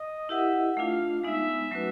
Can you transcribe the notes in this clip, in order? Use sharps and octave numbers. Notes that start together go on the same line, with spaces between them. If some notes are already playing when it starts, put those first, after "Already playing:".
Already playing: D#5
E4 G4 A#4 D#5 E5 F#5
A3 D4 F4 F5
G#3 B3 D#4 E5
F#3 A3 C#4 F#4 B4